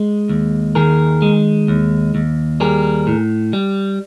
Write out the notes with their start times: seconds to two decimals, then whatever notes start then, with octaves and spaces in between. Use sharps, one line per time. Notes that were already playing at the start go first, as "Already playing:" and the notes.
Already playing: G#3
0.29 D#2
0.75 D#3 G#4 A#4
1.22 G#3
1.68 D#2
2.15 D#2
2.60 G3 G#4 A#4
3.07 A2
3.53 G3